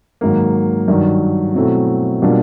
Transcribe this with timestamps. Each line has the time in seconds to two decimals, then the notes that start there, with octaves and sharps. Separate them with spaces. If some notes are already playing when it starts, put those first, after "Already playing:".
0.21 G#2 D#3 F#3 A#3
0.88 G2 D#3 F#3
1.55 B2 F#3 A3 C4 E4
2.22 B2 G3 A#3 D4 F4